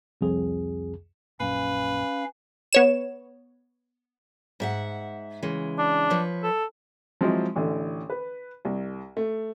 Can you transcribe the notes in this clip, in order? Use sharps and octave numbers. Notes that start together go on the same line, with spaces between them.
C2 F2 G#4
A#1 F#2 A#2 C#4 B4 F5
B3 C#5 E7
G#2 E5 F#5
C#3 E3 G#3
D4
F3 B4 C#5
A4
F3 F#3 G#3 C4 E4
A1 D3 E3
B4
C2
A3